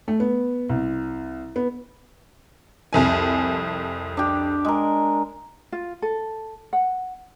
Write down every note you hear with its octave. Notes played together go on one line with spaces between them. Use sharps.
A3
B3
C2
B3
C2 F2 G#5
D4 G4
G#3 A#4
F4
A4
F#5